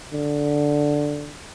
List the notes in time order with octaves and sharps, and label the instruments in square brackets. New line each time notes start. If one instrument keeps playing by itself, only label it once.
[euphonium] D3